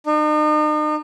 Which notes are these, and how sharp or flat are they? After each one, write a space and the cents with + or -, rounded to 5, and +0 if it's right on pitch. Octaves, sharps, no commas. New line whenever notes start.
D#4 -45